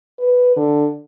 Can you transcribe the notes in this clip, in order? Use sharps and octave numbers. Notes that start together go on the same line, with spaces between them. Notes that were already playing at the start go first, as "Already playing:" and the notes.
B4
D3